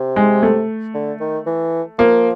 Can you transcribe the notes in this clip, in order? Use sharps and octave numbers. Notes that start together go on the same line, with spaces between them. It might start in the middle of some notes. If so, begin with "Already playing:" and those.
Already playing: C3
G#3
A3
D3
D#3
E3
F3 A#3